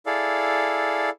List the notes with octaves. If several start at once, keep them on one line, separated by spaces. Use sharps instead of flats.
E4 G#4 A4 D5 F5